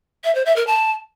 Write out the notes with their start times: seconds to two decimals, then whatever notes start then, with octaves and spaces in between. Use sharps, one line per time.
0.24 E5
0.35 C5
0.46 E5
0.56 A#4
0.67 A5